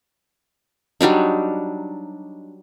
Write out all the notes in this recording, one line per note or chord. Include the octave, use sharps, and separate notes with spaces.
F#3 G3 D4 D#4